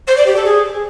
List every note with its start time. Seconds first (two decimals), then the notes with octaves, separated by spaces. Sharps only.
0.07 C5
0.16 D5
0.26 G4
0.35 A4
0.45 G#4